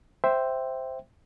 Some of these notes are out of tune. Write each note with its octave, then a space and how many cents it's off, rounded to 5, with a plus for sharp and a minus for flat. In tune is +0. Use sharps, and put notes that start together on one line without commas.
C5 +0 E5 +0 G5 +0